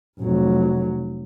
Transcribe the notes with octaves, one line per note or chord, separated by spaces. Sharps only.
F1 F#3